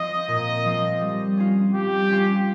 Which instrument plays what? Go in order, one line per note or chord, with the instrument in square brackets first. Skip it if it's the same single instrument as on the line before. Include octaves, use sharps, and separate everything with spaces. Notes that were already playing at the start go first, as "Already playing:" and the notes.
Already playing: [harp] F3 C4 [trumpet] D#5
[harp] A#2
F3 C4
G3
C#4 F4
[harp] G3 [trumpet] G4
[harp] C#4 F4